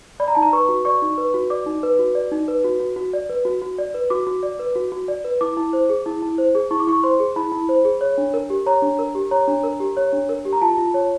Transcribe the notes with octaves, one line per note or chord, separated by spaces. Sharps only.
D5 B5
A#5
D#4 A5
A#5
B4 C#6
F#4
D5 C#6
D#4
B4
F#4
D5 D6
D#4
B4
F#4
D5
D#4
B4
F#4
F#4
F#4
D5
B4
F#4
F#4
D5
B4
F#4 D6
F#4
D5
B4
F#4
F#4
D5
B4
E4 D6
E4
C5
G#4
E4
E4
C5
G#4
E4 C#6
D6
E4 C#6
C5 C6
G#4
E4 B5
E4
C5
G#4
C#5
D4
A#4
G4
C#5 A#5
D4
A#4
G4
C#5 A#5
D4
A#4
G4
C#5
D4
A#4
G4
A#5
F4 A5
F4
C#5